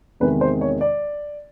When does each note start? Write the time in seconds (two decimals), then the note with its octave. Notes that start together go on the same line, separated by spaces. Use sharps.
0.20 E2 C3 D#3 G#3 B4
0.41 C5
0.61 C#5
0.81 D5